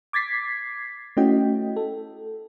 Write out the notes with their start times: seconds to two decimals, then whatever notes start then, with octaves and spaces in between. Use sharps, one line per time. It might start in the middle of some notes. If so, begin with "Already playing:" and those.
0.13 D6 G#6 A6 B6 C7
1.17 A3 C#4 E4 F#4 D#5 G5
1.76 A4